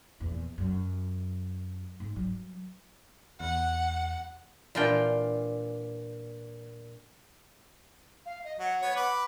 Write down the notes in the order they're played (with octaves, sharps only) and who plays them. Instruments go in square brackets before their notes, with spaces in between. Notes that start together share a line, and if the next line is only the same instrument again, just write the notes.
[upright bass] A#1 E2
F#2
G#2
F#3 G3
[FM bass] E2 [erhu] F#5
[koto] A#2 E3 D4 F4 G5
[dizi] F5
D#5
[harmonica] F#3 [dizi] F#5
[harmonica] B3 C#5
B4 D6